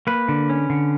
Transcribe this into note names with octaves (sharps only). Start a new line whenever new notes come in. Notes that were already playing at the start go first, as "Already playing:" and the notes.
A#3 B4
D3
C#4
D3